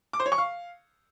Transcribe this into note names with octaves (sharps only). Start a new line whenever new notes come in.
D6
C5
C#5
C#6
F5